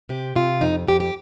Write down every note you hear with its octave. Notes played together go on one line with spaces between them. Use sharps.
C3 G4
C3 F4
F2 D#4
F2 G4
G4